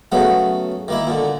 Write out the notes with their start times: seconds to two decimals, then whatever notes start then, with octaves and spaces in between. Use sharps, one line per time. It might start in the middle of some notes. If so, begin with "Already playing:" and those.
0.12 C#3 F#3 A3 B3
0.88 D#3 A#3 E4
1.07 A#2 D3